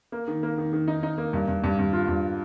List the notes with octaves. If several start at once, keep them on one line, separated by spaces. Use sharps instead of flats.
A#3
D#3
A#3
D#3
D#3
D#4
D#4
A#3
G2
G2
G2
G2
F4
G2